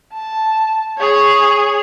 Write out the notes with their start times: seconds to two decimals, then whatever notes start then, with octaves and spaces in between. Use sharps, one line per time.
0.13 A5
0.98 G#4 C#5